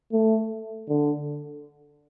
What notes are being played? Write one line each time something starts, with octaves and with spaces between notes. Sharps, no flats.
A3
D3